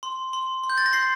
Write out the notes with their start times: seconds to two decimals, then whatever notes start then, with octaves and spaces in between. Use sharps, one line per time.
0.03 C6
0.33 C6
0.63 C6
0.70 G6
0.78 A6
0.86 A#6
0.93 C6 C7